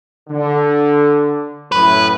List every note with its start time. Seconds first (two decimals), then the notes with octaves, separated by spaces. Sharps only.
0.29 D3
1.72 F#2 A2 B4